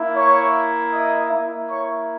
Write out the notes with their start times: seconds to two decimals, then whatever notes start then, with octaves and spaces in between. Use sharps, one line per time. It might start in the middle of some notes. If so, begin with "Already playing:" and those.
Already playing: A#3 E4
0.15 C#5 C#6
0.93 D#5 D#6
1.31 A#3 E4
1.70 C#5 C#6